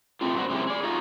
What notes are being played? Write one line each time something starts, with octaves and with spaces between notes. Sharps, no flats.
B2 D#3 A3 C4 F4
G2 B2 C4 F#4
C#3 G#3 C4 C#4 E4 G4
G#4 D5
D#4 F4 F#4 D#5